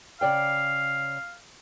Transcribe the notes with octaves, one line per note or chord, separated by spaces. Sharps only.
C#3 D5 F5 G5